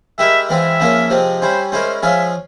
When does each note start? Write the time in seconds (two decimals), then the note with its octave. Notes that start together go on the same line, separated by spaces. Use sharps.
0.18 G#3 E4 G4 A#4 E5
0.49 E3 G#3 C4 F4 E5
0.80 C#3 F3 A#3 C#4 F4
1.10 C3 F3 G#3 C4
1.41 G3 C#4 E4 C5
1.72 G#3 C#4 E4 A#4 C5
2.03 F3 G#3 C#4 F4 G#4 E5